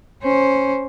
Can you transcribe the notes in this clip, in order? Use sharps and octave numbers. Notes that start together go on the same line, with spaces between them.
C#4 C5